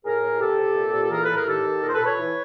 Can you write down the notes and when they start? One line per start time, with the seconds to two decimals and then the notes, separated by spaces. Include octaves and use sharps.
0.05 A2 G#4 A#4
0.23 A2
0.40 C3 G4 A4
0.58 C3
0.76 A#2
0.94 A#2
1.11 E3 G#4 A#4
1.23 A4 B4
1.29 A2
1.35 G#4 A#4
1.46 D#3 G4 A4
1.65 D#3
1.82 A#2 G#4 A#4
1.88 C5
1.94 A4 B4
2.00 A#2
2.05 B4 C#5
2.18 E3